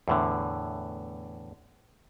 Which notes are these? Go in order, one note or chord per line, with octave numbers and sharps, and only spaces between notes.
E2 A2 D3